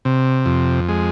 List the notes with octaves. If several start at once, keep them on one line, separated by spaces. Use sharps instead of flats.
C3
F2
G#3